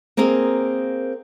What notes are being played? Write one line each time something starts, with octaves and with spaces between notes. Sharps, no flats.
A#3 C4 G#4 A#4 D#5